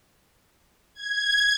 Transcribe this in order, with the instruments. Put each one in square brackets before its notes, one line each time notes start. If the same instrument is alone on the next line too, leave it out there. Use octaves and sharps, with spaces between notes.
[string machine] G#6